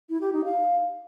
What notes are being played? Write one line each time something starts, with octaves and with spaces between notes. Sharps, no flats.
E4
G4
D#4
F5